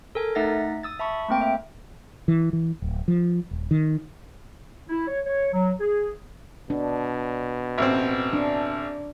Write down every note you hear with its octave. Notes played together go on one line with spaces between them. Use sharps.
A4 A#4 G#5
A3 D#4 E5 F#5 A6 A#6
D#6 E6 A6
E5 A5 B5 C#6
A3 A#3 C4 G5 D7
E5
E3
E3
D1
F3
D#1
D#3
E4
C#5
C#5
F#3
G#4
B2 D4
A1 C4
D4